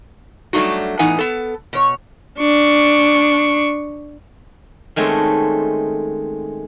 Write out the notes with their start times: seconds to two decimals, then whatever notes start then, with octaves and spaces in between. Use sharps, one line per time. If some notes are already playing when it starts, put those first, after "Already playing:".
0.53 F#3 G3 A3 D4 D#4 F#4
0.99 A2 E3 B3 D#4 F#5 G#5
1.19 B3 A4
1.73 B2 C#5
2.38 D4 C#6
4.96 D#3 G#3 A3 C4 C#4